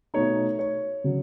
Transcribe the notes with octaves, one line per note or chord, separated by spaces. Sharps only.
B2 A3 D#4 C#5
C#5
C#3 F#3